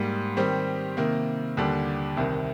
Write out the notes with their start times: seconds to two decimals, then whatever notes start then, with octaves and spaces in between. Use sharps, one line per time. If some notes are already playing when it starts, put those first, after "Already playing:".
Already playing: G#2 G3 A#3
0.37 D#3 G3 C4 G4
0.97 C3 D#3 A#3
1.57 D#2 D3 G3 D4
2.17 C2 C3 D#3